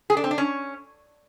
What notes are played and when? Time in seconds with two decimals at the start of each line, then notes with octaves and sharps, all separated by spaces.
0.10 G#4
0.17 D4
0.24 C4
0.31 D4
0.38 C#4